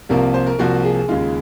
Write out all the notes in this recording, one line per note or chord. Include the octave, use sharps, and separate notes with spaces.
C2 C3 F3 A#3 A#4
C5
A#4
C2 C3 F3 A#3 F#4
G#4
D#2 C#3 G#3 F4